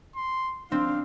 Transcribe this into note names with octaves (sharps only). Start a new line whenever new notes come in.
C6
C4 D4 F5